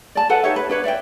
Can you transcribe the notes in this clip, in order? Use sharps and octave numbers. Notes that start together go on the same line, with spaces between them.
D5 A5
A4 B4 F#5 A5
D#4 G4 C#5 E5
B4
D4 B4 C#5
D5 E5 F5 G5